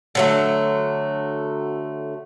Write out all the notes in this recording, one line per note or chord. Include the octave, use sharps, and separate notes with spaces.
D3 F#3 A3